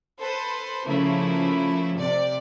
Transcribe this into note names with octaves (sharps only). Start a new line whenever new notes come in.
A4 B4 C5
C#3 F3 A3 A#3 E4
C3 D5